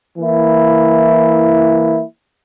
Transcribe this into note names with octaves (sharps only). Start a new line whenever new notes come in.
E3 A#3 E4